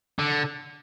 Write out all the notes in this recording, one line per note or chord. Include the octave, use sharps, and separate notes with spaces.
D3